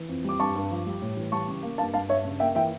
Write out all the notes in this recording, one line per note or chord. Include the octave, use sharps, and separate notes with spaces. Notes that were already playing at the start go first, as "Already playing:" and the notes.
Already playing: E3
F2
G3 D6
G2 A5 C#6
G2
F3
G3
A2
E3
G3 A5 C#6
C#3
A#3
G2 F5 A5
G2 F5 A5
G2 C#5 E5
C#3
A#3 E5 G5
E3 E5 G5